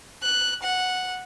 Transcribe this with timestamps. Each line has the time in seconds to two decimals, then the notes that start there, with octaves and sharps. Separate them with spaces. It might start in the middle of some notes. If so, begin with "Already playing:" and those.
0.23 F#6
0.63 F#5